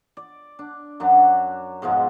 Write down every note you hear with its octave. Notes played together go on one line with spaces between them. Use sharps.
D5
D4
F#2 F#3 D4
G#2 B2 F3 G#3